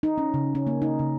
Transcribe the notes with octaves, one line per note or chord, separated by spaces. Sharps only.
D#4
C#4
C#3
C#4
A#3
D#4
C#3